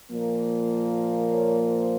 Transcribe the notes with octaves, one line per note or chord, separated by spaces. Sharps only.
A#2 F3 A#3
C#5
C5